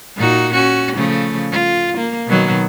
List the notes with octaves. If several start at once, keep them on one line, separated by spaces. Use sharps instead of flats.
A#2 D#4 F#4
C#4 F#4
C#3 F3 A3
F4
A#3
B2 D#3 F#3